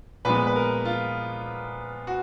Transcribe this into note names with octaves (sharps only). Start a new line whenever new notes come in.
A#2 F3 G#3 B3 B4
B4
A#4
F4
F#4